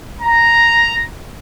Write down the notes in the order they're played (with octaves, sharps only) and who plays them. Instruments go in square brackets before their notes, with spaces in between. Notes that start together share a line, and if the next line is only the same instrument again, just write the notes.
[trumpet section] A#5